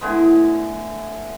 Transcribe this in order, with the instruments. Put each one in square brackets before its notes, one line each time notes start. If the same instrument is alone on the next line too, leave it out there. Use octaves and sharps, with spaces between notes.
[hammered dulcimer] A2 D3 G#3 B3